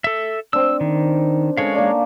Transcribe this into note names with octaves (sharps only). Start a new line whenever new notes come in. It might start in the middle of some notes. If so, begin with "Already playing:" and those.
A4 E5
C4 D4 E6
D#3
D#3 G#3 C#4 A4 C#5 F5
A#3 D4